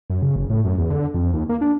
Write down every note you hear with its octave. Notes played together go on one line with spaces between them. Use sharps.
F#2
C#3
F#1
A2
F#2
E2
D3
F2
D#2
A#3
D4